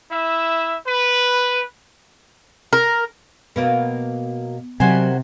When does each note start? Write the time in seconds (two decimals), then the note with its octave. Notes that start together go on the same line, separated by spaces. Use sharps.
0.11 E4 E5
0.87 B4
2.73 A#4
3.56 B2 F#3 A#3 B3
4.80 C3 D#3 F#3 G3 F#4 C5 G#5